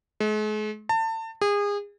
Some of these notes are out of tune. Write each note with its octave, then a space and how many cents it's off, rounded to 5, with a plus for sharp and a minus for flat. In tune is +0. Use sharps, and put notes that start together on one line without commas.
G#3 +45
A5 +30
G#4 -30